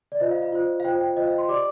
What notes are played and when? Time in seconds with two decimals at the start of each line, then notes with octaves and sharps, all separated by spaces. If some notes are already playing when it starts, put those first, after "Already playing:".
0.12 D5
0.20 F4 C5 D#5
0.31 F5
0.42 F5
0.52 F4 C5
0.80 F5
0.84 F4 C5 G5
1.01 G5
1.17 F4 C5 D#5
1.27 F5
1.38 C6
1.49 G4 D5 D6